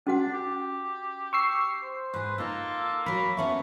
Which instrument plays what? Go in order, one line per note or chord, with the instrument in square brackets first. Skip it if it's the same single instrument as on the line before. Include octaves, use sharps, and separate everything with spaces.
[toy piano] C#4 F#4 F#5 [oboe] D4
[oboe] G4
[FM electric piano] C#6 E6 C7
[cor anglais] C5
[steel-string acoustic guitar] G#2 G#4 [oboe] B4 [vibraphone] C6
[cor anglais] A#3 [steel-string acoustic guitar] D#4 F4 [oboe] A4
[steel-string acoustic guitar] F#3 A#4 [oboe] B5
[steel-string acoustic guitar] B3 C#4 A4 [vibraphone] E5 [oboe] C#6